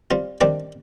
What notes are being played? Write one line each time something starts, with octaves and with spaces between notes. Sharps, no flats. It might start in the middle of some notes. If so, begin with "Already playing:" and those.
G3 C4 F4
D#3 G3 C4 D4 D5